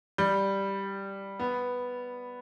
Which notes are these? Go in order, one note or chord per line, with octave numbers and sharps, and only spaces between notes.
G3
B3